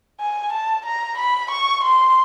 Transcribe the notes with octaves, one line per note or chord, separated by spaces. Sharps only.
G#5
A5
A#5
B5
C#6
C6